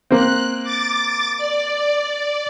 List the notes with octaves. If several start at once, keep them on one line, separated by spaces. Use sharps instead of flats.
A#3 C4 F#6
D6 A6
D5